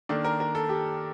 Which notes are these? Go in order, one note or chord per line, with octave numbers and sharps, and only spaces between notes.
D#3 A#3 D4 A4
A#4
A#4
A4
G4